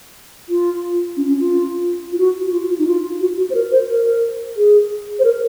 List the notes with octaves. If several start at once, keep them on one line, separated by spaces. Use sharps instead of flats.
F4
C#4
C#4
F4
F4
F#4
F#4
F4
F4
D#4
F4
F#4
F#4
C5
A#4
C5
A#4
G#4
C5
A#4